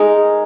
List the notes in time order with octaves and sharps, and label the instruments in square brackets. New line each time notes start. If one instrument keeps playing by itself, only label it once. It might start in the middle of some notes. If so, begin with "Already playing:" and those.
Already playing: [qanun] G#3 D#4 A#4 [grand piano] G#4